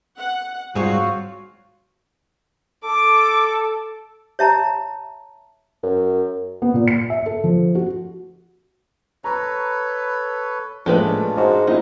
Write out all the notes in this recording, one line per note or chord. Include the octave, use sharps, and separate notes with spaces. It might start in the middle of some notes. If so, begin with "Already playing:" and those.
F#5
G#2 G3 C4 F4 F#4 G#4 C#5
A4 D6
C#5 E5 A5 A#5
F#2
B3
A#2
C#7
E5
A4
F3
F#4
A4 B4 C#5 A#5
A#1 A2 G#3 C#4 D4 F4 G4 B4
G#2 F#4
D#3 A#3 D#4 E4